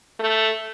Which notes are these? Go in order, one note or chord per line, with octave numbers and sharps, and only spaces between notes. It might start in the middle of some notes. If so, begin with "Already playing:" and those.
A3